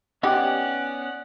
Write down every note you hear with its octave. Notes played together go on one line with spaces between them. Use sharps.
B3 C#4 D#4 G4 D5 F#5